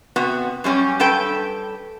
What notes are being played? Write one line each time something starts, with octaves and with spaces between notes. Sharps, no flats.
C3 B3 F#4
F#2 G3 C#4
G2 A4 B4 G5